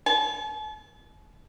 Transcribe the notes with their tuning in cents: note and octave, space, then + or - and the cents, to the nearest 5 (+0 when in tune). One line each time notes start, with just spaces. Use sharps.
A5 -45